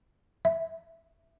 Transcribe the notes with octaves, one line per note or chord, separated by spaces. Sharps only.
E5